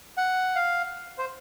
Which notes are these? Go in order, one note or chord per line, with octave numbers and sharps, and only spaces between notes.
F#5
F5
C5